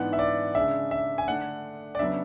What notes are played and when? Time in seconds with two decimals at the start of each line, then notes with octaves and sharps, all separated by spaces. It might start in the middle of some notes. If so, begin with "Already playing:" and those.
Already playing: G#2 E3 B3 D4 F#5
0.13 E5
0.19 D5
0.55 C#3 G#3 D4 E5
0.91 E5
1.18 G#5
1.27 D3 A3 D4 F#5
1.95 D5
1.99 C#3 F#3 B3 D4 E5